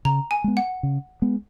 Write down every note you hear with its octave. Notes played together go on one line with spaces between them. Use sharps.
C#3 A#5
G#5
G#3 B3
F#5
C#3
G#3 B3